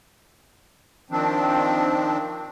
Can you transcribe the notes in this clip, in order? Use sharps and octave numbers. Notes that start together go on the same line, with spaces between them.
D#3 F3 C4 D4